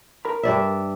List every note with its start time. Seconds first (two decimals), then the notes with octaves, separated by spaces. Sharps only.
0.25 A#4 B5
0.43 G2 D5 E5